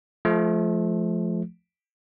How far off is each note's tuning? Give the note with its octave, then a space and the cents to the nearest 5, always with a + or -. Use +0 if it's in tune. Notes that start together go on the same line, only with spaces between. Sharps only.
F3 +0 A3 -30